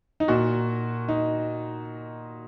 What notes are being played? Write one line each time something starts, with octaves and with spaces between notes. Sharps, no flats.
D#4
A#2 F#4
D#4